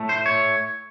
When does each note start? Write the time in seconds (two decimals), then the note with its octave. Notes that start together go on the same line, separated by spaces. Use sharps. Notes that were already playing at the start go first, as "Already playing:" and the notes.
Already playing: A2 A3
0.09 C5
0.26 C#5